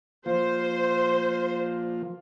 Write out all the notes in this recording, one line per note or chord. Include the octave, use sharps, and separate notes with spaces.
F3 A#3 F4 C5